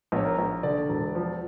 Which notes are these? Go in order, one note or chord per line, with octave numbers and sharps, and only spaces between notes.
A#1 C#5
A#4
A#1
D3 D5
E1
F3